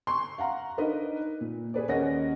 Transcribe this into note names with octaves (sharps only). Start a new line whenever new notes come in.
C6 C#6
F5 F#5 A#5
D4 D#4 A#4 B4 D#5
A#2
G#4 B4 D5
D#2 C#4 A#4 D#5 F#5 A#6